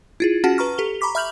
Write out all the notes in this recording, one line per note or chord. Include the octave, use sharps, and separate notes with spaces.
E4 F4 G#4
C#4 F4 F#4 G#4 F#5 A5
B4 A#5 C#6 F6
G4 A4 F7 G7
A#5 B5 C#6 D6 B6
E5 B5 F6 G6 F7 F#7